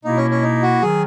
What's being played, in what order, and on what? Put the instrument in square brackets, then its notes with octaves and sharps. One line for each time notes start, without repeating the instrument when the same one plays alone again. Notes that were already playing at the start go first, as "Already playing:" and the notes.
[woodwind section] B2 A#3 E4 [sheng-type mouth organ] D#4
[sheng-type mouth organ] C#4
C#4
D#4
F#4
[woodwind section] D#3 F#3 [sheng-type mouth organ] G#4